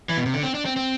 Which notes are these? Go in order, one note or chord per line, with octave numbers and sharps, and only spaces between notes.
E3
B2
C3
D3
C4
D4
C4
C4